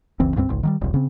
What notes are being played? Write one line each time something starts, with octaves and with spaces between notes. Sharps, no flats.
F#1 C#2 E3 C4
C#2 G2 F#3 C4
G#1 C#2
D#3 F#3 G3
E1 C2
C#3 C4